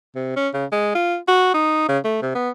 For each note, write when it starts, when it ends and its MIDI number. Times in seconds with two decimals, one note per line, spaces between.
0.16 0.32 48
0.36 0.49 61
0.54 0.66 49
0.72 0.95 56
0.95 1.16 65
1.28 1.54 66
1.54 1.88 63
1.89 1.99 49
2.05 2.20 57
2.22 2.35 48
2.35 2.50 59